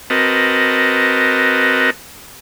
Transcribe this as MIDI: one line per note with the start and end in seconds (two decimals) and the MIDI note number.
0.10 1.90 60
0.10 1.90 66
0.10 1.90 70
0.10 1.90 71
0.10 1.90 75
0.10 1.90 81